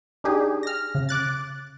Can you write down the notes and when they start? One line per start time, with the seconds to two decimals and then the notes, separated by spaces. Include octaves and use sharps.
0.24 D4 D#4 G4 G#4
0.63 F6 A#6
0.95 C#3
1.09 D6 F#6 A6